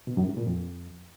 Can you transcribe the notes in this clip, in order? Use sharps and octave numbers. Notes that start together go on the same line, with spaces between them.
B2
F#2
G#2
A#2
F2